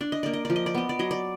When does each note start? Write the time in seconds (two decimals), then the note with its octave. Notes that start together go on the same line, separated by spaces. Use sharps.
0.01 D4 D5
0.12 D#5
0.23 A#3 D5
0.33 D#5
0.45 F3 D5
0.56 D#5
0.66 D5
0.74 B3 D#5
0.89 D5
0.99 F#3 D#5
1.11 D5